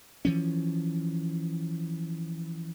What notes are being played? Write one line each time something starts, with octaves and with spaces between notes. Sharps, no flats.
E3 F3 C#4